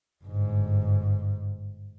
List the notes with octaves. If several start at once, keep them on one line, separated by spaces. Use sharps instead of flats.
G1 G#2